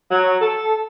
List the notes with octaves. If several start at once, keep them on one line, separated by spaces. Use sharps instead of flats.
F#3
A4